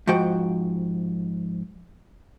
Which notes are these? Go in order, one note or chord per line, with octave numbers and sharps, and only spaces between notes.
G#2 F3 F#4 G5